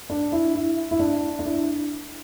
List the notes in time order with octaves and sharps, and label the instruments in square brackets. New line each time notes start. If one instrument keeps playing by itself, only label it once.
[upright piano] D4
E4
E4
E4
D4
D4
E4